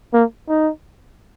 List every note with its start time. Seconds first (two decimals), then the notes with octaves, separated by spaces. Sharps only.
0.13 A#3
0.49 D#4